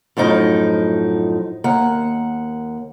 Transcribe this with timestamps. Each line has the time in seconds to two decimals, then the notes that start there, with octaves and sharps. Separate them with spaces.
0.17 F#2 A2 F3 D#4
1.64 D#2 A#3 F#5